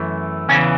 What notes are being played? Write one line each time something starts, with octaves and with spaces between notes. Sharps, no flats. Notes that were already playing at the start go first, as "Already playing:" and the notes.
Already playing: F#2 E3 A3
E2 C#3 E3 C#4